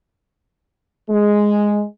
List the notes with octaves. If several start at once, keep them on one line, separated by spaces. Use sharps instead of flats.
G#3